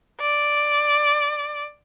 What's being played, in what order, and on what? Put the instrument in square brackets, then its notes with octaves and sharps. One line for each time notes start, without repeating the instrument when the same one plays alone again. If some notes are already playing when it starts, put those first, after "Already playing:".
[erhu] D5